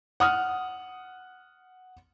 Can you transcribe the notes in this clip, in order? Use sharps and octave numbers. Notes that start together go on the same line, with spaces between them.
F#5 D#6 F6